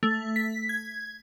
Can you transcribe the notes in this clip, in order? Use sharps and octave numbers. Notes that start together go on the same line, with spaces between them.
A3
B6
G#6